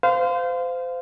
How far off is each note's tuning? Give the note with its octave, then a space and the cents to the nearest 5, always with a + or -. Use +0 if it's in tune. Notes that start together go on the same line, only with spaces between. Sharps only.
C5 -30 F5 +0